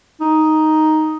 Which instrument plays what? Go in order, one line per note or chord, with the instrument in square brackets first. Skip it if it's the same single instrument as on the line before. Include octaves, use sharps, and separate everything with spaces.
[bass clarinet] D#4